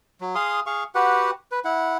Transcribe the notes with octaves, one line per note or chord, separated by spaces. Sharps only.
F#3
G#4 F5 C6 D#6
G#4 F5 C#6
F#4 G4 B4 F#5
B4
E4 F#5